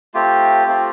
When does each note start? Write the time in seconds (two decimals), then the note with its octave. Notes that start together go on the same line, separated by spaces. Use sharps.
0.14 A3 C4 F4 G4
0.67 A3 C4 F4